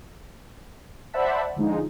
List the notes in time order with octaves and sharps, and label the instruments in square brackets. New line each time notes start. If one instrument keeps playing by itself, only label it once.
[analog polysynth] C5 D5 E5 F#5 A5 B5
D3 F3 G#3 D#4